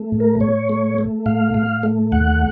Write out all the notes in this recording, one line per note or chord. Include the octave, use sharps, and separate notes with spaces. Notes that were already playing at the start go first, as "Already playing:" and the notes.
Already playing: A3
A2
A#4
A2 C#5
A3
A3
A2 F5
A2
A3
D#2 F#5